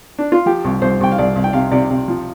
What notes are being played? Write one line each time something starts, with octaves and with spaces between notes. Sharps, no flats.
D4
F4
F3 G4
C2
C2 C5
C2 G5
F5
C2 D5
C2
G5
C3 F5
C3 D5
C3
F3